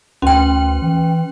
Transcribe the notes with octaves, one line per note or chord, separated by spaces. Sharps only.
D2 C#4 G5
E3